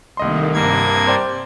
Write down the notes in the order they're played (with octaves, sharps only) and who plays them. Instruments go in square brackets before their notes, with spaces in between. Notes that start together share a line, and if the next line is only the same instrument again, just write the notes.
[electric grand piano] C2 D#5 C6 [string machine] D#3 A3 A#3
[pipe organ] G2 A#3 G#6 [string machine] C3
[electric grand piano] C5 D5 G5